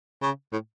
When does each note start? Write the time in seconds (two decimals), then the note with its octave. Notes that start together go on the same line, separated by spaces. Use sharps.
0.22 C#3
0.52 A2